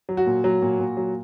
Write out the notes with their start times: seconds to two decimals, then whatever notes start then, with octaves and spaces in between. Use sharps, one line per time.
0.09 F#3
0.17 F#4
0.26 A#2
0.44 F#3
0.62 A#2
0.79 A#2
0.97 F#3